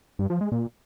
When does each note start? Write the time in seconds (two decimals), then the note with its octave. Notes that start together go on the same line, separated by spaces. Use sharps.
0.19 G2
0.30 F3
0.41 G#3
0.52 A#2